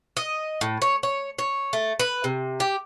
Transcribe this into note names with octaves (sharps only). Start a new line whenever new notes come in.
D#5
A2
C#5
C#5
C#5
A3
B4
C3
G4